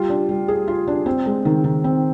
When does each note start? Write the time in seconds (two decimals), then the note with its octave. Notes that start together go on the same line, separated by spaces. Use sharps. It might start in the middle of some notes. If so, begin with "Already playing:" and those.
Already playing: G3 F4
0.09 D4
0.29 G3
0.48 G#4
0.68 F4
0.87 D4
1.06 C4
1.26 G#3
1.45 D#3
1.64 D#3
1.84 C4